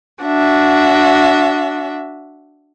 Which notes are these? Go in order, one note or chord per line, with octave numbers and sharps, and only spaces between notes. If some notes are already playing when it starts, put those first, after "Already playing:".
D4 F#4 E5